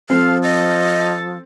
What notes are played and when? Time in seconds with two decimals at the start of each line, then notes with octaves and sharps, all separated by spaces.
0.10 F3 C4 A4 F5
0.43 A4 D#5